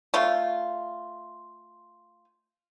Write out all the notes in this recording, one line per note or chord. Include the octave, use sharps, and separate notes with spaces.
A3 F4